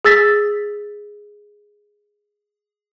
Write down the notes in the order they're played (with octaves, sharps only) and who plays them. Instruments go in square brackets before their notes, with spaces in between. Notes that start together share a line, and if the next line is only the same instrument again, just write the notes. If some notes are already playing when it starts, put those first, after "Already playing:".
[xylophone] G#4 E6 A6 B6